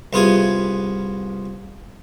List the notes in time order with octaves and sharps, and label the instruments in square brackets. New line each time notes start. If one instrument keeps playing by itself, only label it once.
[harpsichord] C2 B3 F4 G#4 G#5